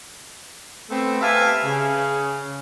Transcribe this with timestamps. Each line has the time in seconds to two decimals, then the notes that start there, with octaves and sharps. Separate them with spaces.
0.91 A3 B3 C4
1.21 G4 B4 E5 F5 G#5 A5
1.65 C#3